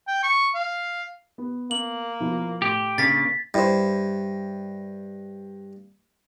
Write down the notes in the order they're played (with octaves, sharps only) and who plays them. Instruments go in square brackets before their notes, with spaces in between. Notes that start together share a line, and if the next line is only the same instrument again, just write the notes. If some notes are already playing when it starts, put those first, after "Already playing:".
[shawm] G5
C#6
F5
[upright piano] B3
[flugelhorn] A#3 [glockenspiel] F#7
[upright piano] B2 F3 E4
[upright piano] A2 C6 [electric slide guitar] G4
[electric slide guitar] C#3 A#3 D4 [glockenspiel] A6 B6
[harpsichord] G2 [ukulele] E4 C5